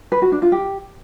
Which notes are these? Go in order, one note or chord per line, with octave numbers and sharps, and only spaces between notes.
B4
F#4
D4
F4
G4